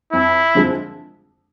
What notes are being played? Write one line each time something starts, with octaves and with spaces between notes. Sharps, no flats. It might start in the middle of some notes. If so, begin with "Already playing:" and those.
F2 E4
D3 F3 G#3 C4